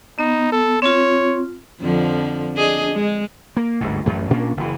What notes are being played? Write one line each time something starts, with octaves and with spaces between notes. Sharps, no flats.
B3 D#4
A4
C4 F4 C#5
F2 D3 F3
D4 G#4 D#5
G#3
A#3
G1 D2 G#2
A1 F#2 A3
A#2 A#3 C#4 D4
F#1 E3